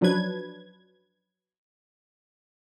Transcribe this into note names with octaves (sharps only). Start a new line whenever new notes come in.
F#2 F3 F#3 D4 B4 G#6